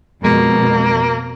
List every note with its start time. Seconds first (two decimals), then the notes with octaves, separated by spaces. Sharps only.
0.25 F2 B2 G#3 A#3